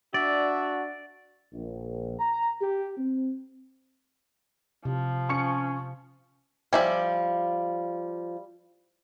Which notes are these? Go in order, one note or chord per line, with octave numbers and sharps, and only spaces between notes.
D4 F#4 D5 E5
A#1
A#5
G4
C4
C3 F3
C#4 C#6 C#7
F3 G3 E5 G#5